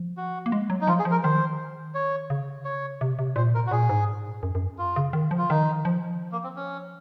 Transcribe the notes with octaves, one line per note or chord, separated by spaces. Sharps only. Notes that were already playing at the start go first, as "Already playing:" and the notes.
Already playing: F3
F#4
A#3
G#3
F#3
D#4
F3 F4
G#4
F3
A#4
D#3 C5
C#5
C#3
C#5
C3
C3
A#2 C5
A#4
F#4
A#2 G#4
G#2
F#2
F#2
F4
C#3
D#3
F3
F4
D#3 D#4
F3
A#3
C4
C#4